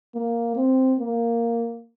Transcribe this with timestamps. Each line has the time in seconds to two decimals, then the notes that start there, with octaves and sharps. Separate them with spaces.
0.15 A#3
0.56 C4
0.99 A#3